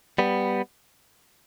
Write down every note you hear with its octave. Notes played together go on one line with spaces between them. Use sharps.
G3 B3